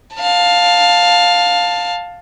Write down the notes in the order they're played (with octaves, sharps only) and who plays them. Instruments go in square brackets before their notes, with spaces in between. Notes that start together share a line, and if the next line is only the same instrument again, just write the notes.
[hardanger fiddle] F5 A5